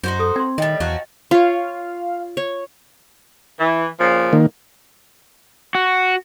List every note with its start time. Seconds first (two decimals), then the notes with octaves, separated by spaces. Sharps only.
0.04 F#2 D#4 F#4 C5
0.19 A4 D#6
0.36 C4 C6 G#6
0.58 A2 D#3 G3 D#5 G5 A6
0.80 E2 F3 F#3 F#4
1.31 F4 C#5 F5
2.37 C#5
3.58 E3
4.00 A#2 C#3 F3
4.33 D#3 A#3
5.75 F#4